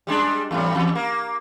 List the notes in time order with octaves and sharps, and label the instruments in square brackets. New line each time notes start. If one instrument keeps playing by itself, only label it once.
[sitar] G3 G#3 D4
E2 A2 G3
E2
A#3